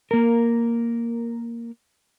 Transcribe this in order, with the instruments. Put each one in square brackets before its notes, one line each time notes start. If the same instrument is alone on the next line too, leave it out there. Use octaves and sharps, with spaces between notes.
[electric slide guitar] A#3 A#4